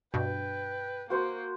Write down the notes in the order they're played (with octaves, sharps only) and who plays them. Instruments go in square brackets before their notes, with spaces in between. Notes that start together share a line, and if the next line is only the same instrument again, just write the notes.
[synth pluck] G2 B2 [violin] B4 [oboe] G5
[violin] A#3 [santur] F#4 C5 F#5